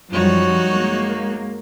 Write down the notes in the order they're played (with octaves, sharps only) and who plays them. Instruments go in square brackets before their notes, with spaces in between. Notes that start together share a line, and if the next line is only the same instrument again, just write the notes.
[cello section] F#2 F3 G3 [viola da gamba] D#4 F#4 C#5
[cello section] G#3 A#3